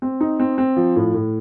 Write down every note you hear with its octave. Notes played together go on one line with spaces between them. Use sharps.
C4
D#4
C4
C4
F3
A2
A2